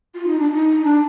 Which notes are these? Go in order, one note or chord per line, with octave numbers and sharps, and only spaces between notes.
F4
D#4
D4
D#4
D4